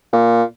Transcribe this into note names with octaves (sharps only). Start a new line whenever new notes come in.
A#2